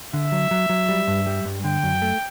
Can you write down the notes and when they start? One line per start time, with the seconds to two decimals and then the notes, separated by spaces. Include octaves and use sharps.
0.13 D3 E5
0.32 F#3
0.51 F#3
0.69 F#3
0.89 G3
1.07 G2
1.27 G3
1.45 G2
1.64 D3 G5
1.83 F#2
2.02 A3